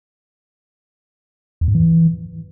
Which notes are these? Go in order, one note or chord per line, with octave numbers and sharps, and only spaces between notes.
E2
G#2
E3